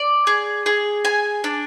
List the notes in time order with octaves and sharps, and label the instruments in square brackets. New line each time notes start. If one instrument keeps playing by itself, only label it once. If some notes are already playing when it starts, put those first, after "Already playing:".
Already playing: [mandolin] D5
G#4
G#4
G#5
D4